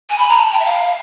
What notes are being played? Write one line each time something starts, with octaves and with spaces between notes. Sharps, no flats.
G#5
B5
A#5
A5
G5
E5
F5